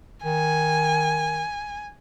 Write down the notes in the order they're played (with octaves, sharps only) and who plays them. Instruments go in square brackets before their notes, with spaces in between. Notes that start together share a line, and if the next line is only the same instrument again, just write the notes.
[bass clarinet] D#3 [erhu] G#5